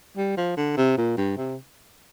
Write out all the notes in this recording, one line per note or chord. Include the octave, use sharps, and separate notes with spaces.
G3
F3
D3
C3
A#2
G2
C3